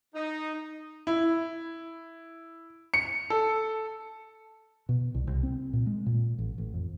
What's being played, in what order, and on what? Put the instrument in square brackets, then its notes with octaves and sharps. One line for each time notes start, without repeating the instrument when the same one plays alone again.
[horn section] D#4
[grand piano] E4
C#7
A4
[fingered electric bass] B2
C2
C2
C4
A#2
G#3
A#2
A1
A1
F2